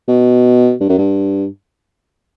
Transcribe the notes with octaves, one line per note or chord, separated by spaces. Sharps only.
B2
G2
F#2
G2